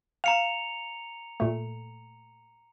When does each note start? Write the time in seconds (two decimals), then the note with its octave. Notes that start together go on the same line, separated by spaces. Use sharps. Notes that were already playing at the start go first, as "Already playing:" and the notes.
0.24 F5 A#5 C#7 F7
1.40 A#2 A3